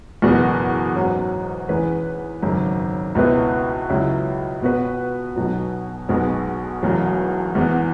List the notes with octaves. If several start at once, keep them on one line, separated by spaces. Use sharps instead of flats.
F#1 E2 B2 B3
G#2 F#3 C#4 F#4
E2 E3 C#4 G#4 B4
G#1 F#2 C#3
C#2 B2 B3 E4 B4
C#2 C#3 F#3 E4
B2 B3 F#4 B4
B1 B2 F#3
B1 B2 G#3 B3
E1 E2 B2 F#3
E2 E3 B3